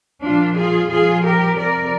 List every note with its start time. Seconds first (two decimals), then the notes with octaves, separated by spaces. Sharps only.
0.23 A#2 F3 D4 F4
0.56 F4 G#4
0.90 A#2 F3 F4 G#4
1.24 G4 A#4
1.57 C3 F3 A#4 D5